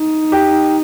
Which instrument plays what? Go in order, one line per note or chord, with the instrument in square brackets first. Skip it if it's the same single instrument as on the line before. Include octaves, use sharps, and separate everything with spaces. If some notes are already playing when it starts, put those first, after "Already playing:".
Already playing: [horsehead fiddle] D#4
[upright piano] G4